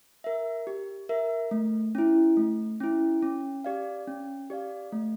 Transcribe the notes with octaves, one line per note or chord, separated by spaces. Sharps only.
A#4 E5
G4
A#4 E5
A3
C#4 E4
A3
C#4 E4
C#4
G4 D5 F5
C#4
G4 D5 F5
A3